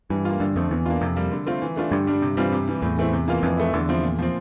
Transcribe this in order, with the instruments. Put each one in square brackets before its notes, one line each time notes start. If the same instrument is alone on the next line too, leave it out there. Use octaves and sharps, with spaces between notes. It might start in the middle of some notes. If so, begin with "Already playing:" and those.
[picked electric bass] G2 [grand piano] E3
[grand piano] A#3 F4
[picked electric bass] G2 [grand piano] D3
[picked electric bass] F2 [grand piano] A3 C4
[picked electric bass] E2 [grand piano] E3
[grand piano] A#3 D4 F4
[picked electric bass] F2 [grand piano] C3
[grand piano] G3 A#3
D3
A3 C4 F4
E3
A3 D4 F4
[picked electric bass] G2 [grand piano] D3
[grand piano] G3 D4
C3
E3 G3 C4 F4
C3
E3 G3
[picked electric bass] E2 [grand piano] A2
[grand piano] E3 A3 C4 E4
C3
E3 A#3 F4
[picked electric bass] F2 [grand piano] E3
[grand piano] A3 E4
[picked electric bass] E2 [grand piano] D3
[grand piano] F3 C4 E4
A#2
F3 C4